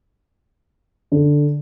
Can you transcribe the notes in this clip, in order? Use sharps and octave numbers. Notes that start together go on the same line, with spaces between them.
D3